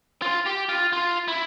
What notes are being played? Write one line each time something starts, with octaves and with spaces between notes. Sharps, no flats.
F4
G4
F4
F4
E4